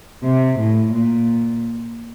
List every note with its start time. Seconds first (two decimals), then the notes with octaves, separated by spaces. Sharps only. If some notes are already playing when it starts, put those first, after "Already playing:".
0.24 C3
0.59 A2
0.94 A#2